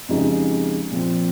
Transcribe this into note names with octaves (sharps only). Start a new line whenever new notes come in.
F2 C#3 G#3 D#4 G4
A#2 F3 C4 F4